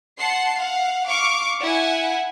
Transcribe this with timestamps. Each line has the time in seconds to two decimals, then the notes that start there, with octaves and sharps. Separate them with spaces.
0.18 F#5 A5 C6 C7
0.58 F5 F#5
1.06 F5 C#6 D6
1.61 E4 F#5 G#5